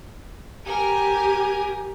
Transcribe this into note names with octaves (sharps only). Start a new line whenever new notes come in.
G4 A#4 G#5